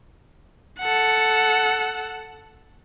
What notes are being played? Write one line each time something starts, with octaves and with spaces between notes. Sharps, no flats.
A4 F#5